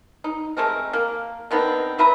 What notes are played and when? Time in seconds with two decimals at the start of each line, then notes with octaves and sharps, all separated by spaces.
0.24 D#4
0.57 G#3 A3 C4 A#4
0.93 A#3
1.51 D3 D#3 B3 C4
1.98 F#3 B4 E5 A#5